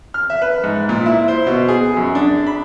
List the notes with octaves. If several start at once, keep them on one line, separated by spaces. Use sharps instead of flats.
F6
E5
B4
G#2
A#2
E4
C5
B2
G#4
F#2
D4
B5